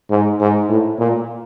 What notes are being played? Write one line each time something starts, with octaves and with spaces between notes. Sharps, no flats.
G#2
G#2
A2
A#2